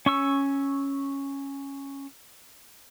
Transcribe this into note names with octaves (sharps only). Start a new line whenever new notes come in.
C#4 C#6 E6